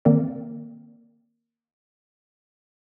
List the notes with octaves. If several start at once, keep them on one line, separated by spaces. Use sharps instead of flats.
D#3 A#3 C4 A#4 D5